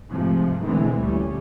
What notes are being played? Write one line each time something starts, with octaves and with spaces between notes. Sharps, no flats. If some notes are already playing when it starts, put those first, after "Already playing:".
G#2 C3 F3 G#3 A3
B2 D3 E3 G#3 A3 C4
D2 A#2 G3 C#4